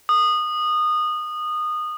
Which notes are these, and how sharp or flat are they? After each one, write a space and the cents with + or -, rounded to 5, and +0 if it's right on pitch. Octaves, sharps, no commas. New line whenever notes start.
D#6 -20